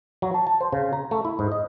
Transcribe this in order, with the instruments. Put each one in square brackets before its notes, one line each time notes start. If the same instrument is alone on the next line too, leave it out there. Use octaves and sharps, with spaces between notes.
[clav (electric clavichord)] F#3
A5
A5
C5
C#3
A#5
A3
E4
G#2
D#5